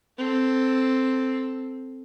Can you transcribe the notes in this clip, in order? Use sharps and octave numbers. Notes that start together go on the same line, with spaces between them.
C4 A4